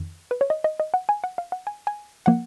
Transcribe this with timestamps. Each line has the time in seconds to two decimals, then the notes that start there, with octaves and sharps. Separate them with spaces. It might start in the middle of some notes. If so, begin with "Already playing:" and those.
Already playing: F2 D#3
0.31 B4
0.41 C#5
0.50 D#5
0.64 D#5
0.80 D#5
0.94 F#5
1.09 G#5
1.24 F#5
1.38 F5
1.52 F#5
1.67 G#5
1.87 G#5
2.26 F3 A#3 F#5